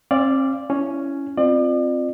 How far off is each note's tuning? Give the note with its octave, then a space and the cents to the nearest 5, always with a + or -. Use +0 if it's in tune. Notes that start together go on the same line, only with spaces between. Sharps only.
C4 +45 D5 +0 F5 -20
C#4 +5 E4 +5
C4 +0 F4 +0 D5 +40